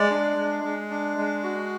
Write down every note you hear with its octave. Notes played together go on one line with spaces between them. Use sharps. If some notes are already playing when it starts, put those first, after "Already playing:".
Already playing: G#3 D5
D4
G#3
G#3
D4
G#3
F#4